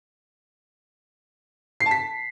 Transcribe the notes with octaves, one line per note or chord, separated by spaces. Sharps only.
C7
A5
B6